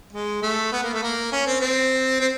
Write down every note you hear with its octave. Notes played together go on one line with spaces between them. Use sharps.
G#3
A3
B3
A#3
A3
A#3
C#4
C4
C4
C4